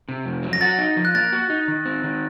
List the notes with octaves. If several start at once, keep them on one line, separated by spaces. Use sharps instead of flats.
C3
F2
F#3
A#6
F#4 A6
D#4
F3
F#6
A#3 A6
F#4
D#4
D#3
C4
D#3